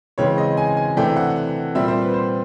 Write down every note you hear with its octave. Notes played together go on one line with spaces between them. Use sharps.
C#3 E3 G#3 C4 C#5
D#5
G#5
G#5
C3 E3 A3 D4 G5
F#5
A#2 G3 C4 E5
C5
B4
C5